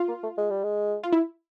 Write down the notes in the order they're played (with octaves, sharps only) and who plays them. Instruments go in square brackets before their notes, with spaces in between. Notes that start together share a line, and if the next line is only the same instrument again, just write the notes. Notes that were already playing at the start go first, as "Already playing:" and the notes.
Already playing: [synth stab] F4
[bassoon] A#3
A3
G#3
G3
G#3
[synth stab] F4
E4